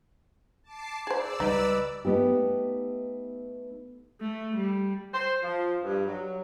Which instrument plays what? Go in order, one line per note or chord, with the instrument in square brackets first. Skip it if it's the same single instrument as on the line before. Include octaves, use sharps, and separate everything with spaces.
[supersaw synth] A5 D6 C7
[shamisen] G#4 C5 [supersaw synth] D5 E6
[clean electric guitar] C#2 G3 D#5 [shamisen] D#4 [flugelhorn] B4
[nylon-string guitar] A3 B3 D#4 G4
[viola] A3
G3
[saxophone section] C5
F3
G2
F#3